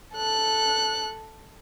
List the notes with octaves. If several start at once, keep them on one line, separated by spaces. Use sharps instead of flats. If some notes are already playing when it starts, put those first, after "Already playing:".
A4 F#6